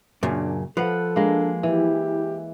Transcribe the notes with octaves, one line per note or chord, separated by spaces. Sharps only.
F#2 A#2 C#3 D4
F3 A4 B4 F#5
G#3 A#3 D4
E3 E4 G4